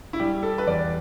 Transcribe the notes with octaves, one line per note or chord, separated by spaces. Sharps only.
E4
G3 G4
A4
B4
E2 D5